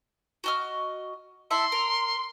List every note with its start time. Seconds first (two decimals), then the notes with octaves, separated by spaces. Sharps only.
0.44 F#4 D#5 F6
1.51 E4 A4 E5 C6
1.72 A#4